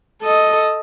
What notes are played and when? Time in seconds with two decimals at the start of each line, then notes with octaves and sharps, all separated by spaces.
0.22 A4 D#5